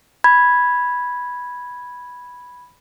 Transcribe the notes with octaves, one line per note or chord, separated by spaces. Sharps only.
B5 G#6